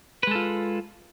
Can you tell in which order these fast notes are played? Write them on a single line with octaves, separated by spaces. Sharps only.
B4 G#3 A4 F4